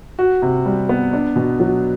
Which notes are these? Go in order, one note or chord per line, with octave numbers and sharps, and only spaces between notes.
F#4
C3
G3
B3
D4
B2
F#3